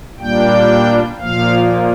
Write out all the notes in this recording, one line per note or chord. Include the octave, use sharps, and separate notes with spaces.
A#2 G3 A#3 D4 G5
A#2 F3 A#3 F5